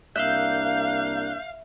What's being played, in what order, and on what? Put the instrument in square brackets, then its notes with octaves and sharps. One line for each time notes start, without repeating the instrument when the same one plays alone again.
[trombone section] C2 A#3 D4 [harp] E5 [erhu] F5 [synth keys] F#6 G6